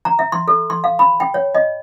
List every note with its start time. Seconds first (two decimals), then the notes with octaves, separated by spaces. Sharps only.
0.05 A#5
0.19 E5
0.32 C6
0.48 A4
0.70 C6
0.84 F5
0.99 B5
1.20 G5
1.34 C#5
1.54 D#5